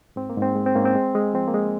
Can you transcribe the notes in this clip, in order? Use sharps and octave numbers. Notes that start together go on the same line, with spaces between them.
G#2 C4
A#3
G#2
C4
G#3
C4
G#2 A#3 C#4
C4
G#3
G#3
F3 C4
A#3
G#3